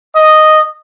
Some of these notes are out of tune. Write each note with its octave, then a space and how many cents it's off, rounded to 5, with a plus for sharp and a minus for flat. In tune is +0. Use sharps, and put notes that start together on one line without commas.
D#5 -5